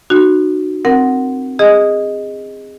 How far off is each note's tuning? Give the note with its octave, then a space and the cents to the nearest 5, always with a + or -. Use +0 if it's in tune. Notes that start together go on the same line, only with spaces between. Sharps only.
D#4 -40 F#4 +0
C4 +0 A#4 +0 F#5 +5
G#4 -20 D#5 +0 D#6 +0